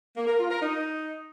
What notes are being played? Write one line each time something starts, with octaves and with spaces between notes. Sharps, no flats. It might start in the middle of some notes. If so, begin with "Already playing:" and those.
A#3
A#4
F4
A#4
D#4